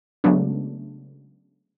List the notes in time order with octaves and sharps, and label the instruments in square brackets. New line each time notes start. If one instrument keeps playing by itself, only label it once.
[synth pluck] C#3 F#3 G#3 A3 B3 D4